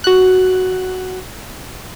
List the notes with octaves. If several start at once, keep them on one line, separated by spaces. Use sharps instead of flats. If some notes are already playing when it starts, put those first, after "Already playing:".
F#4 F#6